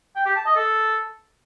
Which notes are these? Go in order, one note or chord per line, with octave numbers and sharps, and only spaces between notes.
G5
G4
A5
D#5
A4